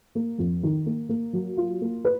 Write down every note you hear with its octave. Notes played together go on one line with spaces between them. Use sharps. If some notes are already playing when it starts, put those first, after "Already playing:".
A#3
F2
D#3
A#3
A#3
F#3
F4
A#3
B4